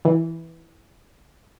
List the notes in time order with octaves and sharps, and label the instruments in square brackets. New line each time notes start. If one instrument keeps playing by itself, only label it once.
[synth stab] E3